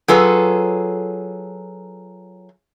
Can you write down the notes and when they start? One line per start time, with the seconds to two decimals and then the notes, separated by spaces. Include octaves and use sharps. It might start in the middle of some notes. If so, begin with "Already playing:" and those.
0.08 F#3 F4 G#4 A4 B4